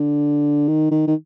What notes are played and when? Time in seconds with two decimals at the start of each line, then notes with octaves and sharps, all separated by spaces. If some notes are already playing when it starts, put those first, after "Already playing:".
Already playing: D3
0.68 D#3
0.91 D#3
1.07 D#3